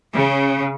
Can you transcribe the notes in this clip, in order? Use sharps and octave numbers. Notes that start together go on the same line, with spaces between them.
C#3